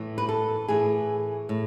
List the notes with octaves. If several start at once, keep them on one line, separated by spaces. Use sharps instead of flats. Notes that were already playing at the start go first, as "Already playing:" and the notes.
Already playing: A2 E3
B4
A4
A2 E3 G#4
A2